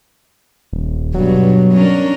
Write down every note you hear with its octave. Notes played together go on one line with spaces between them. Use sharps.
D#1
G2 B2 F#3
C#4 D4 A#4